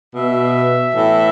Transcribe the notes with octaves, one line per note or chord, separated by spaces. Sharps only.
B2 E5
A2 E3